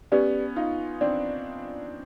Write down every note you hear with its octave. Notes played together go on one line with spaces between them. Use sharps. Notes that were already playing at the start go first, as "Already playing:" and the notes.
B3 C#4 G4 B4 D5
D#4 F4
C4 D4 D5